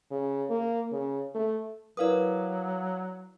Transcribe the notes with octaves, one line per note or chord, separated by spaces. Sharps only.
C#3
A#3
C#3
A3
F#3 E4 A#4 B4 D5 F5 D#6